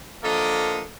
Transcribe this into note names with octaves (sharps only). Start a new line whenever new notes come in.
D3 F3 A#3 A4 A#4 D#5